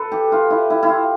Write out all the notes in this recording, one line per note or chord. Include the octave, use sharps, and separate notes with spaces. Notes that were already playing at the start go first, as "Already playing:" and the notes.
Already playing: A4 B4
G4
F4
E4
E4
E4
F4